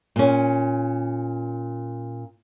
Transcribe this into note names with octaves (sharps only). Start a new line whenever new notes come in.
A#2 C#4